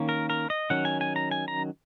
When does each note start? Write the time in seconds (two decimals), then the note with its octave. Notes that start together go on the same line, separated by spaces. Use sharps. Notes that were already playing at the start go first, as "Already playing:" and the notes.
Already playing: D#3 A#3 C#4
0.09 A#4
0.30 A#4
0.50 D#5
0.70 D#3 F#3 C#4 F#5
0.85 G#5
1.01 G#5
1.16 A#5
1.31 G#5
1.48 A#5